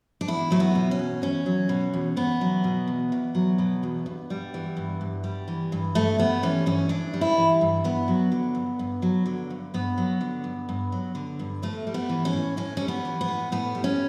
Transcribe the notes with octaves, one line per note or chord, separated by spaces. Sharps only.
D4
E2 E4
F#3 A3
B3
B2
C#4
E2
E2 C#4
F#3
B2
E2
E2 B3
F#3
B2
E2
E2
F#3
B2
E2
G2
G3
E3
G2
G2
G3
E3
G2
G2 A3
G3 B3
E3 C#4
G2 C#4
G2 D4
G3
E4
E3
G2
G2 B3
F#3
D3
G2
G2
F#3
D3
G2
G2 B3
F#3
D3
G2
G2
F#3
D3
G2
A2 A3
G3
B3
E3
C#4
A2
A2 C#4
G3 C#4
B3
E3
B3
A2
A2 B3
G3
C#4